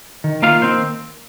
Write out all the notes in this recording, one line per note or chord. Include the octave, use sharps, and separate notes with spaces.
D#3
A#3 F4 F5
D#3 C4 C5